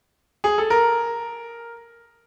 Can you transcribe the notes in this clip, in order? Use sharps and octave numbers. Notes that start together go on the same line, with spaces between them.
G#4
A4
A#4